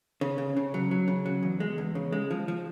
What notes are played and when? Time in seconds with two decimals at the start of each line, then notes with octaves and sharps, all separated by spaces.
0.21 C#3
0.38 C#3
0.57 C#3
0.74 F#3
0.91 F#3
1.08 C#3
1.26 F#3
1.43 E2
1.60 G#3
1.78 E2
1.95 C#3
2.13 G#3
2.31 F3
2.48 F3